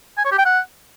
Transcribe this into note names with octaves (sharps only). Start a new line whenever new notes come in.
G#5
C#5
G4
G5
F#5